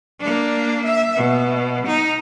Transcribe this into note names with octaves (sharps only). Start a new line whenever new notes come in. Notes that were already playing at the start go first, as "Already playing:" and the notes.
A#3 D4
E5
B2
D#4